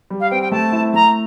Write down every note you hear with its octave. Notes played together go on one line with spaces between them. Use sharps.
G3
F5
C4 G5
G5
A3 A5
E4
A3 A#5